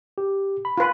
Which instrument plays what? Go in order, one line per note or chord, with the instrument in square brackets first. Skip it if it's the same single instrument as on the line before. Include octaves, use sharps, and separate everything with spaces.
[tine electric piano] G4
B5
[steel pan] F4 B4